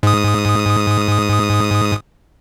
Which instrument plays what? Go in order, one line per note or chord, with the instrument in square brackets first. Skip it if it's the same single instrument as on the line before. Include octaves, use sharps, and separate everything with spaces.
[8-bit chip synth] G#2 D#6